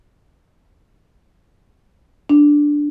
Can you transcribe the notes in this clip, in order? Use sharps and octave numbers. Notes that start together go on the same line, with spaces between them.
D4